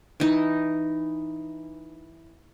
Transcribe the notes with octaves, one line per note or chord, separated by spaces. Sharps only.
E3 D#4